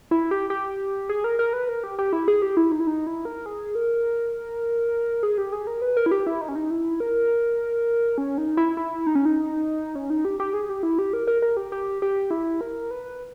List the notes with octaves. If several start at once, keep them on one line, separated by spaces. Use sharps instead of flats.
E4
G4
G4
G#4
A#4
A#4
B4
A#4
G4
G4
E4
G#4
G4
E4
D#4
E4
D#4
E4
A#4
G#4
A#4
G#4
G4
G#4
A#4
B4
A#4
E4
G4
E4
D#4
C#4
D#4
E4
A#4
C#4
D#4
E4
E4
D#4
C#4
D#4
C#4
D#4
G4
G4
G#4
G4
E4
G4
A#4
A#4
A#4
G4
G4
G4
E4
A#4
B4